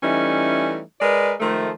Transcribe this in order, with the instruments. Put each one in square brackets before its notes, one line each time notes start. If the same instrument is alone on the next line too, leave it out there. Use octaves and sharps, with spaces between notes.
[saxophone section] E3 G3 A3 C#4 D#4
G#3 A#4 B4 D5
D#3 F3 G#3 A3